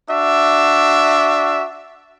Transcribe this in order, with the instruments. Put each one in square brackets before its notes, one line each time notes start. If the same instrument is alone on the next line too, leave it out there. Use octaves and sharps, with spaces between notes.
[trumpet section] D4 F#4 E5